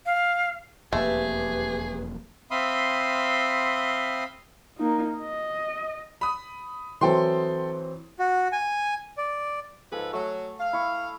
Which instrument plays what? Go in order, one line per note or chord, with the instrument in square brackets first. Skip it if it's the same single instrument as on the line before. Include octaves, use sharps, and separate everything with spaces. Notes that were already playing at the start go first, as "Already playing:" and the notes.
[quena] F5
[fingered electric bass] E1 F2 A#3 [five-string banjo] A3 [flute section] G4 B4 [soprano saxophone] G#4
[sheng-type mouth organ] C4 E5 F5 B5 C6 D#6
[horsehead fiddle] A#3 D#4
D#5
[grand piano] B5 D#6
[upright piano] E3 F#3 C4 [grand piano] A4 G5 C6
[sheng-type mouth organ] F#4
G#5
D5
[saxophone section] G#2 F3 B4 [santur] G#4 A4
[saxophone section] F#3 [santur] A3
[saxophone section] F5
[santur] E4 C#6